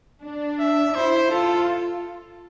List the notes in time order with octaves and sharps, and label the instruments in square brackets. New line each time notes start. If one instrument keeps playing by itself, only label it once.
[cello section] D4
[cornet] E5
[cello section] E4 [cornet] C5
[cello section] F4 [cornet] A4